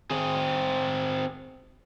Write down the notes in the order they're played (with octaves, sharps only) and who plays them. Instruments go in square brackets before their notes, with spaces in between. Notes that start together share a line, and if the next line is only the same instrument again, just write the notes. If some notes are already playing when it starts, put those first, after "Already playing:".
[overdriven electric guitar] C4 G#4